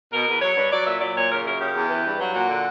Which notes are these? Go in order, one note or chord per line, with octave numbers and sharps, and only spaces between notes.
B2 A#4
E2 B4
F#3 C#5
G2
F#3 D5
A#2 E5
F#3 D5
A#2 C#5
C#3 A#4
F#2 A#4
C#3 G4
E2
E3
G2
F#3 F#4
A#2 F#4
D3